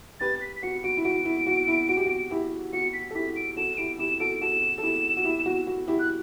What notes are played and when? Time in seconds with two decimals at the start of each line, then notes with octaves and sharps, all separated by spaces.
0.20 G4 B4 A6
0.41 B6
0.56 B6
0.63 F#4 C#7
0.84 F#4 D7
0.97 E4
1.04 F#4 D7
1.25 E4
1.47 F#4
1.68 E4
1.89 F#4
1.97 G4
2.06 F#4
2.31 E4 G4
2.73 F#4 C#7
2.93 B6
3.10 A4
3.15 E4 G4 B6
3.36 D7
3.56 F#4 A4 E7
3.74 E7
3.77 E4 G4 D7
3.98 E4 G4 E7
4.20 F#4 A4 D7
4.41 F#4 A4 E7
4.78 A4
4.83 E4 G4
5.17 F#4
5.24 E4 G4
5.46 F#4
5.67 F#4
5.88 E4 G4
5.99 F#6